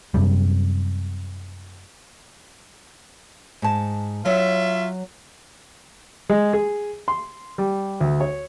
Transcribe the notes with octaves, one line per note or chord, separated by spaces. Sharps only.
F#2 C3 G3
G#2 A5
F#3 F4 C#5 E5
G#3
G#4
C6
G3
D2
C#5